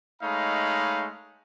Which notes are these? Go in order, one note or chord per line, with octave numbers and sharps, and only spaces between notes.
G#3 A3 D#4 C#5 F5 B5